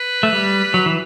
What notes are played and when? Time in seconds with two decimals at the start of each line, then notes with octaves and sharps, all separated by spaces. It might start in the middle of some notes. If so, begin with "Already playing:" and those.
Already playing: B4
0.23 A3
0.33 G3
0.74 F#3
0.86 E3